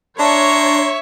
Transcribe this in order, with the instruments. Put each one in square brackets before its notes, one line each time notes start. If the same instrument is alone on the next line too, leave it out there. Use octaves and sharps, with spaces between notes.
[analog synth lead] D4 [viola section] C#5 [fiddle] E5 C#6 [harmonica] A#5 C6